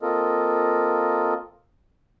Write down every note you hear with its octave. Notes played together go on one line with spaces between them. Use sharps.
A#3 C4 F4 A4 A#4 D#5